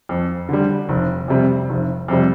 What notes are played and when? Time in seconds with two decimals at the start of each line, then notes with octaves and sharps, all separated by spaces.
0.09 F2
0.49 D3 G3
0.89 F1
1.28 F2 C3 G3
1.69 F1
2.08 F2 C3 G3